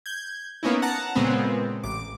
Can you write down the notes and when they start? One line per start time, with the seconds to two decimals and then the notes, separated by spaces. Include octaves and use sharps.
0.06 G6 G#6
0.63 A#3 B3 C#4 D#4 E4
0.82 F#5 A5 A#5
1.15 A#2 C#3 G#3 B3 C4
1.84 A1 D6